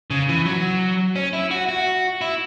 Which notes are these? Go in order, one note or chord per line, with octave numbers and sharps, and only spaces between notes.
C#3
E3
F#3
C#4
E4
F#4
F#4
E4